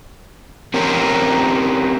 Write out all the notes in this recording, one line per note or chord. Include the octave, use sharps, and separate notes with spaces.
C4 C#4 G4 A#4